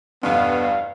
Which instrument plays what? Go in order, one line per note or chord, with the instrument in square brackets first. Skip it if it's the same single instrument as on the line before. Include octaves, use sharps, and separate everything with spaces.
[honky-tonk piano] F1 E2 G2 [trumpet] B3 [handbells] D5 [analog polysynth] F5